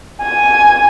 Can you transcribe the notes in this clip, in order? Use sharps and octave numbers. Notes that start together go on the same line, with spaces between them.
G#5